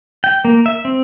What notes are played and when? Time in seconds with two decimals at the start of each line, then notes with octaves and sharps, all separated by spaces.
0.24 G5
0.45 A#3
0.66 E5
0.85 C4